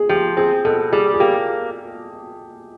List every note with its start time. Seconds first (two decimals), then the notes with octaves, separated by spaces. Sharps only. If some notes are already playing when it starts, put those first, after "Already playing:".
Already playing: G#4
0.09 F3 G4
0.37 C4 G#4
0.65 B2 A4
0.92 G3 G#4
1.14 G#4
1.20 A#3 G4